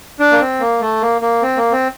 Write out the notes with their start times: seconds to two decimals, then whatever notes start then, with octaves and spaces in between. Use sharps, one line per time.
0.20 D4
0.32 A#3
0.41 C4
0.60 A#3
0.81 A3
1.02 A#3
1.22 A#3
1.42 C4
1.57 A#3
1.72 C4